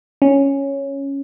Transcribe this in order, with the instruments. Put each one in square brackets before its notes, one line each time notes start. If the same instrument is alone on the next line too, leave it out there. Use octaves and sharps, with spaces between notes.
[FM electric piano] C#4